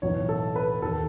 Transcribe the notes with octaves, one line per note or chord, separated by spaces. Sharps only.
B1 A2 E3 C#5
A4
B4
D#2 D#3 A4